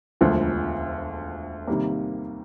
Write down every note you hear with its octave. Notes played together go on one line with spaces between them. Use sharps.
E1 D2 D3 F3
C3 D#3 G3 A#3